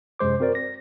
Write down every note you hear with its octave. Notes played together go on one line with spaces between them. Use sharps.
F#2 C3 G#3 C5 D6
C4 F#4 A#4 C5 D5
A#6